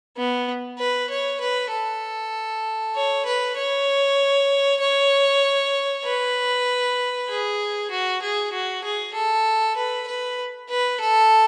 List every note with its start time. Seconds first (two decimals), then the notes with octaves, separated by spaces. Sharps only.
0.17 B3
0.79 B4
1.10 C#5
1.41 B4
1.72 A4
2.95 C#5
3.26 B4
3.57 C#5
4.81 C#5
6.05 B4
7.29 G#4
7.91 F#4
8.22 G#4
8.52 F#4
8.84 G#4
9.14 A4
9.76 B4
10.08 B4
10.70 B4
11.00 A4